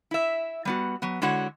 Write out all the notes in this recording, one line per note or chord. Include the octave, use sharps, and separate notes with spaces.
E4 E5
G3 B3 F#4
F#3 B3
D3 G#3 E4 F#4 C#5 F#5